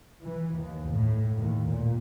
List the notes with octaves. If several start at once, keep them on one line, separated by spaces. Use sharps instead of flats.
E3
D#2
A2
D#2
A#2